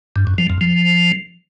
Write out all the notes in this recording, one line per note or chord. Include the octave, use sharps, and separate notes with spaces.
G2
F#2
F3
F2
F3